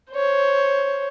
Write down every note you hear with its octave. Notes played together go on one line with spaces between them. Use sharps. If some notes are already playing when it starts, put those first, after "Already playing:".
C5 C#5